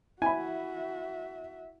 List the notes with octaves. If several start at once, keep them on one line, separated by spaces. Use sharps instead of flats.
E4 F#4 E5 G#5 B5